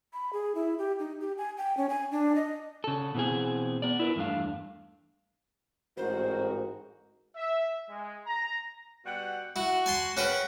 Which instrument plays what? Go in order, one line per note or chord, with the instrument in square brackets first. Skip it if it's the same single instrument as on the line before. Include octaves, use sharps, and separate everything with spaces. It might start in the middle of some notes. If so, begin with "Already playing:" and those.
[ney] B5
G#4
E4
G4
D#4
G4
G#5
G5
C#4
G#5
D4
D#5
[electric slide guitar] C#3 A4
B2 E3 C4 G#4
B3 D5
E4 A#4 B4
E2 G2 A3 D4 F5
[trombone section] A1 G#2 A#4 [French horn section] A3 C4 F#4 [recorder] C5
[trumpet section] E5
G#3
A#5
[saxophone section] B2 G3 F#5
[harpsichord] E4 [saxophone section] F#4
[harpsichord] G#5 A5 C6
[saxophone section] C#3 A#4 B4 [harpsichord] C#4 F#4 G5